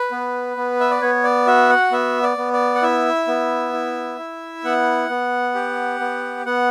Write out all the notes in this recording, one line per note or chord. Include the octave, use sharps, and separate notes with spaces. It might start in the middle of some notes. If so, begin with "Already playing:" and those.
Already playing: B4
B3
B3
E5
D5
B3 C#5
D5
F#4 E5
F#5
B3 E5
D5
B3
D5
F#5
E4 E5
B3
E4
E4
B3 F#5
B3
G4
B3
B3 F#5